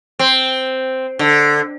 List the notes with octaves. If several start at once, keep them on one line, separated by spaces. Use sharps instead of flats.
C4
D3